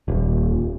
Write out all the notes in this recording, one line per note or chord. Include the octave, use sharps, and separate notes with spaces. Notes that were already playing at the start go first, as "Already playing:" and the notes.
D#1